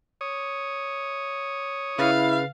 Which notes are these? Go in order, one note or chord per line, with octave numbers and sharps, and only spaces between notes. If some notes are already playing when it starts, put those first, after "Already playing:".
C#5 D#6
C#3 E4 B4 F5 A6